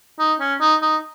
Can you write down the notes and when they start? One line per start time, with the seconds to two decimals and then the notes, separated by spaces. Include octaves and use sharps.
0.19 D#4
0.40 C#4
0.61 D#4
0.82 D#4